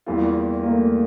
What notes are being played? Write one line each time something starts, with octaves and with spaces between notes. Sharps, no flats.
E2 E3 G3 A#3 F4
A#3
A3